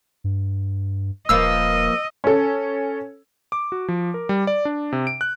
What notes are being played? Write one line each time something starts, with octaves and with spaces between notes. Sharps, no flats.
G2
D#1 F3 A#3 B4 D#5 E6
C#4 A4
D6
F#4
F3
A#4
G3
D5
D4
C3
D7
F#6